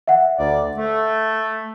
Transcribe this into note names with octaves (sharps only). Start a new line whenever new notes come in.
E5 F#5
D2 D5
A3